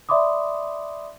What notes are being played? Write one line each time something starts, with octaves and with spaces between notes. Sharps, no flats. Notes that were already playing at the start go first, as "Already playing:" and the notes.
D5 E5 B5 C6 D6 D#6